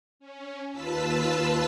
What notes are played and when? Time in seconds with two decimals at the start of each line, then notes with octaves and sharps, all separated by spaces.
0.19 C#4
0.71 D#2 F4 B4 A5 E6 B6